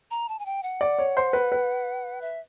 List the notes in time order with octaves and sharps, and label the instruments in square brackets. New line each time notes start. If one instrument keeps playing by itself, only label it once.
[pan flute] A#5
A5
G#5
G5
F#5
[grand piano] D5
C#5
C5
B4
B4
[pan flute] E5